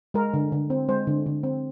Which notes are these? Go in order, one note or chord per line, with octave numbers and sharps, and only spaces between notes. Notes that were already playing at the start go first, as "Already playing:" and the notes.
G#3 A#4
D3
D3
C4
G#3 C5
D3
D3
C4